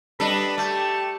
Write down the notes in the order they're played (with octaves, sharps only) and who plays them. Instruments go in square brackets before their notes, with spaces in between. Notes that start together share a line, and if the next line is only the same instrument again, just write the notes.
[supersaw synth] G3 D#5 A#6 [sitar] D4 A4 [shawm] B4
[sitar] A3 [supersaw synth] G4 [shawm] A5